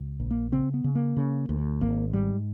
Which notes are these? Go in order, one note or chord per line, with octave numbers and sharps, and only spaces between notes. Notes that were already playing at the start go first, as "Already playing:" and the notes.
Already playing: C#2
A#1
A#3
C#3 C4
B3
C#3
A#3
C#3
D2
G#1 A#3
G#2 G3